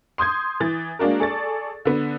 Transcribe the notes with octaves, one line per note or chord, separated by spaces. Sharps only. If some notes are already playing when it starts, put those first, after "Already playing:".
C6 D#6 G6 G#6
E3 A6
G#3 A#3 D4 F#4 A#4
G#4 A4 D5 C#6 A6
D3 B3